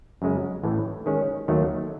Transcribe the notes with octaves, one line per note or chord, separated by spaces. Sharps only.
F#2 C#3 G#3
A1 A2 E3
D#3 G#3 C#4
D#2 D#3 F#3 A3